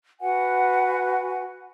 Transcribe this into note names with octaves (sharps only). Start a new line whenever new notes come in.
F#4 B4 F#5 G#5